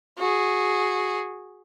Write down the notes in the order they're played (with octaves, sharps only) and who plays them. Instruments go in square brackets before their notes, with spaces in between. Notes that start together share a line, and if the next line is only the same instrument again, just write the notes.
[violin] F#4 G#4